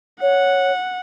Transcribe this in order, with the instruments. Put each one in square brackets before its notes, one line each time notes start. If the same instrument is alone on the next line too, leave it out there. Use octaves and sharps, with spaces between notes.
[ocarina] C#5 [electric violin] F#5